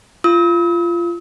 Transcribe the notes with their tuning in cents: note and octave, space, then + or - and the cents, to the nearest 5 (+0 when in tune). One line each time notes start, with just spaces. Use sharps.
F4 -20 E6 -45